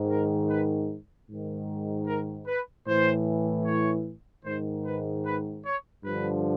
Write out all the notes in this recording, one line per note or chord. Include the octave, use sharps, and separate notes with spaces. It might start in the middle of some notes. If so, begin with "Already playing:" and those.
Already playing: G#2 D#3
A#4
B4
G#2 D#3
A#4
B4
A2 E3 C5
C#5
G#2 D#3 C5
B4
B4
C#5
G2 D3 F3 B4